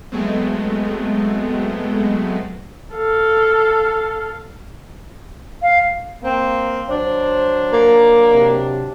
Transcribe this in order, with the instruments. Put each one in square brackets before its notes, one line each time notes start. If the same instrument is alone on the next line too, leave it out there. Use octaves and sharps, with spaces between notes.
[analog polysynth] F#3 G#3 A3 B3 C4
[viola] A4 F5
[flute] F5
[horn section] A#3 C4
[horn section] F#3 D4 [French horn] C5
[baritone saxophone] A#3
[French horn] C3